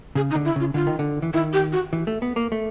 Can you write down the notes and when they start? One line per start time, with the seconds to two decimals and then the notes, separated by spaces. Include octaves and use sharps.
0.15 C#3 G#4
0.30 D#4
0.35 D3
0.45 E4
0.56 C#3 F4
0.74 D3 F4
0.87 D#3
0.99 D3
1.22 E3
1.33 D#3 E4
1.53 G4
1.73 F#4
1.93 E3
2.07 A3
2.22 B3
2.36 A#3
2.52 A3